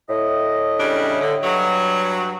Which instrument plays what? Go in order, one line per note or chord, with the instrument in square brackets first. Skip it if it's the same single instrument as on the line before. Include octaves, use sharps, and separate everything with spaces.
[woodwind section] A2 D#5
[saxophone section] C#3 G3 D4
D3
G2 F#3